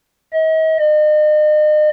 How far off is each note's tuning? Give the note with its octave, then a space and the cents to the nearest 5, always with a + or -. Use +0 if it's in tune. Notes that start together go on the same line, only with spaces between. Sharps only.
D#5 +40
D#5 -40